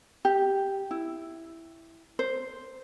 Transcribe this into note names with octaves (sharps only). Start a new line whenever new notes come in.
G4
E4
C5